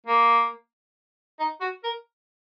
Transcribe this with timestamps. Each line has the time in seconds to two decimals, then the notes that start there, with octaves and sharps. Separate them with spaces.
0.07 A#3
1.40 D#4
1.61 F#4
1.84 A#4